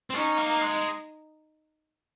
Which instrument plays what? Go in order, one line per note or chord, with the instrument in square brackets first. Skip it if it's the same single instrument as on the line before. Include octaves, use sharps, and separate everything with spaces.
[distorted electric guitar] C4
[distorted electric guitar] C#4 [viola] D#4
[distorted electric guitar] A#3
G#3